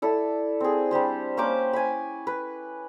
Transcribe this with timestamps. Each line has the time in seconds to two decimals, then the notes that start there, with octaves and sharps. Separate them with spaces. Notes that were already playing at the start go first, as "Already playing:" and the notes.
0.02 E4 A4 D5
0.61 C4 G#4
0.91 G3 D4 G4 C5
1.37 A#3 C#4 C5 D6
1.73 G#5 B5
2.27 B4